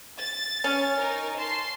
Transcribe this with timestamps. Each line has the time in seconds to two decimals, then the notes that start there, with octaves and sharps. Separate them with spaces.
0.17 A6
0.64 C#4
0.98 D#4 A#4
1.37 A5 C6